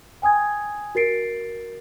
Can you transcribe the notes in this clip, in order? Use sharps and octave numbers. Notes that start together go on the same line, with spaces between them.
G5 G#5 D#6 G#6
F#4 A#4 A6 C7 D7